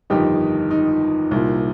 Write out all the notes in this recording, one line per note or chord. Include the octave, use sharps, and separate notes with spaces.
G1 F2 D#3 D#4 G4
D#4
C2 A#2